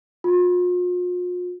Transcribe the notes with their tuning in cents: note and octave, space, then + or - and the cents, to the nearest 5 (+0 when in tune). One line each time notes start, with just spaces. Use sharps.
F4 +40